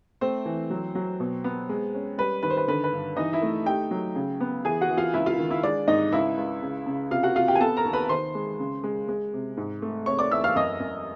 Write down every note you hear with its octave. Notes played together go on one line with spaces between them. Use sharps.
A3 C4 C5
E3
F#3
F#3
B2
B3
G#3
C#4
G3 B4
D#3 B4
C5
B4
D3 B4
B4
G2
E3 D#4 D#5
E4 E5
A3
D#4 G4 G5
F#3
C#3
B3
E3 G#4 G#5
F#4 F#5
E3
F4 F5
C#2 E4 E5
F4 F5
D#3
E4 E5
G#3 D4 D5
G#2 D#4 D#5
C#2 E4 E5
C#2
C#3
C#3
C3 F4 F5
F#4 F#5
C3 F4 F5
G4 G5
G#5
B3 A4 A5
A#4 A#5
D#2
B4 B5
D#3 C5 C6
G#3
C#3
G#3
G#3
C3
G#2
A3
C3 C#5 C#6
D5 D6
E2 E5 E6
F5 F6
F#2 D#5 D#6
F#2